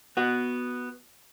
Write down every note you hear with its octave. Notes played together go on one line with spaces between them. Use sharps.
B3 F#4